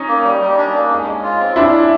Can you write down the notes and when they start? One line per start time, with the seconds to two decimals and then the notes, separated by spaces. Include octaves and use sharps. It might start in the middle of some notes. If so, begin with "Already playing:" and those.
Already playing: C#4 D#4
0.08 A#3
0.25 G3
0.41 G3
0.58 D4
0.74 A#3
0.91 G#3
1.07 G#3
1.23 F4
1.40 C4
1.56 G#3 D4 E4
1.73 G#3